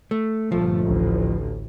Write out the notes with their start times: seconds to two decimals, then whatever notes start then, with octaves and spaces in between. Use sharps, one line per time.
0.11 A3
0.52 G1 A#2 F3 A3
0.87 A1 D2 A2